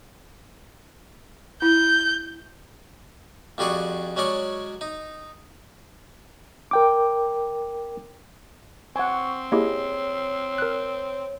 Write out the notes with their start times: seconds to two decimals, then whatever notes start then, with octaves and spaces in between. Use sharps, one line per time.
1.62 E4 G6
3.58 F2 G3 F#4 G#4 D5 C#6
4.16 F#3 G#3 C#4 D5 C#6
4.81 D#4
6.71 A#4 G5 D6
8.96 C4 F#5 G#5 C#6
9.52 A#3 E4 G4 G#4 C#5 D#5
10.58 A#4 F#6